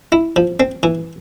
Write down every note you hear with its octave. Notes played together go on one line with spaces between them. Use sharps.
E4
F3
C4
E3